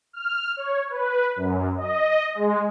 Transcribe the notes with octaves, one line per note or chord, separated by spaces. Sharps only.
F6
C#5
B4
F#2
D#5
G#3